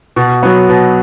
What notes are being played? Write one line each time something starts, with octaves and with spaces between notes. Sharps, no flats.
B2
F#3 B3
B2